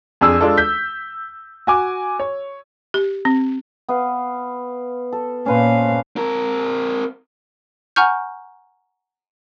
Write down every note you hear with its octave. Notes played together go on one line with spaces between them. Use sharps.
F2 D4 G#4 E6
G#3 D4 F4 A4
G6 B6
F#4 G#5 D6
C#5
G4
C4
B3 F5
A4
A#2 C#4 B4 C5 F5
C4 A#4
F#5 G#5 A#5 C#6 F6 G6